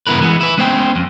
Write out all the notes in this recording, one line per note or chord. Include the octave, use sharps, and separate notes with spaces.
G2 C#3 B3 E4 A#4 B4
E3 G#3 B3
E4 B4
G#3 B3 C#4 C5 G5
F2